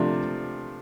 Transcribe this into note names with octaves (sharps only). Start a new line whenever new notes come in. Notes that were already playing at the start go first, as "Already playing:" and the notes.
Already playing: C3 F3 A3 D4